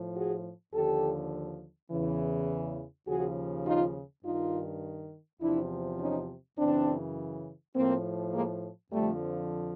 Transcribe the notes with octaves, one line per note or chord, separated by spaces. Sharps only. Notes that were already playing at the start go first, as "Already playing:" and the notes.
Already playing: A2 F3
F#4 G#4
D#2 D3 F3 G4 A4
E2 C#3 E3
D#2 C#3 F3 F#4 G#4
D#4 F4
G2 D#3 D#4 F4
E2 C3 F3 D4 E4
C#4 D#4
F#2 C#3 E3 C4 D4
A2 F3 A#3 C4
G#3 A#3
F2 D3 F3 G3 A3